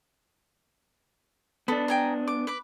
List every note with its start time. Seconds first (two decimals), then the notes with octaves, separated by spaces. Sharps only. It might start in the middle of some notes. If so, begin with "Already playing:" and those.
1.68 B3 D4 A4 B5
1.88 G5 G#5 A#5
2.27 D6
2.47 B4 D6